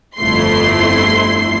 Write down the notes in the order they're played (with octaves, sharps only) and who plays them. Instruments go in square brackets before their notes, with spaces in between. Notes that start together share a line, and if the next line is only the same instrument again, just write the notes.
[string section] G1 F2 A3 E4 C6 C7